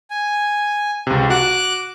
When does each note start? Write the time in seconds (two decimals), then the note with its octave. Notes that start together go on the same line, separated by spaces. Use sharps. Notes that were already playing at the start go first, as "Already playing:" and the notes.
0.10 G#5
1.07 C#2 C3
1.30 F#4 D6 F#6